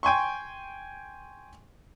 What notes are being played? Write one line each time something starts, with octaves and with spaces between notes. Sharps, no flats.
G5 G#5 C6 C#6